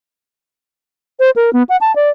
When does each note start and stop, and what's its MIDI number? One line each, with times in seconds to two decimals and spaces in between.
1.20 1.30 72
1.36 1.53 70
1.53 1.63 59
1.69 1.76 78
1.81 1.95 81
1.96 2.10 74